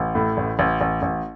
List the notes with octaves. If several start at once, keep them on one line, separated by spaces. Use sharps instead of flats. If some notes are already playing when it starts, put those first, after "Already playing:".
Already playing: A1
A2
A1
A1
A1
A1